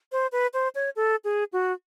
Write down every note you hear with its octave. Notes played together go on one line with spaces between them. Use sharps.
C5
B4
C5
C#5
A4
G#4
F#4